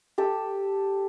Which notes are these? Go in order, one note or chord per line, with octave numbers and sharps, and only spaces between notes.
G4 A4